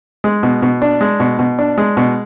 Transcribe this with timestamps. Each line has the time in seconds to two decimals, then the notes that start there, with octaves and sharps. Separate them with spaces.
0.24 G#3
0.43 B2
0.62 B2
0.82 D4
1.01 G#3
1.20 B2
1.39 B2
1.59 D4
1.78 G#3
1.97 B2